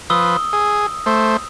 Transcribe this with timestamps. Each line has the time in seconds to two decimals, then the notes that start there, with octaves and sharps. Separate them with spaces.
0.10 F3 B4 D#6 E6 G7
0.53 G#4
1.06 A3 C5